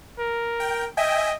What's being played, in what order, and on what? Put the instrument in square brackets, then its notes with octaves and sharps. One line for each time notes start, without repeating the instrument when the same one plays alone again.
[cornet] A#4
[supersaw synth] G5
[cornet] D#5 [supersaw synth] E5 G5 G#5